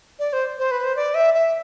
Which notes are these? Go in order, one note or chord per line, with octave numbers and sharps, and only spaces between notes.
D5
C5
C5
B4
C5
D5
E5
E5